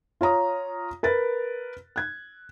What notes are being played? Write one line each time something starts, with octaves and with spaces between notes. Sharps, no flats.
F4 C#5 A#5 D#6
A#4 B4 A6
F#6 G#6